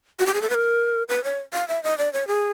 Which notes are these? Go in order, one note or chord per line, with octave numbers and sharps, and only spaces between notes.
F#4
G4
G#4
A4
B4
A#4
B4
C#5
F5
E5
D#5
D5
C#5
G#4